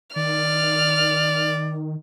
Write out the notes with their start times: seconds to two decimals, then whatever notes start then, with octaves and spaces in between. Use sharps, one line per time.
0.16 D#3 D5 F6